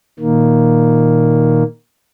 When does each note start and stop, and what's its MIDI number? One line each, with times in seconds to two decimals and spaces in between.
0.20 1.63 46
0.20 1.63 51
0.20 1.63 58